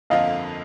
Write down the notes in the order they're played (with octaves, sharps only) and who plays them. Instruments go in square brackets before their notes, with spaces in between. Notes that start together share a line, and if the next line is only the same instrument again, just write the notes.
[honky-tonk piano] G1 F2 D3 F3 A#3 [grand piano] D#5 F5